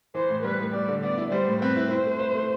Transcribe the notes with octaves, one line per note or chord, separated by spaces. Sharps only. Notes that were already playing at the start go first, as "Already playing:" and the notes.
E3 C5
A2
G3 B4
A2
G3 D5
D3
B3 D5
E4
G3 C5
A2
C4 B4
E4
E4 C5
A3
B4
A3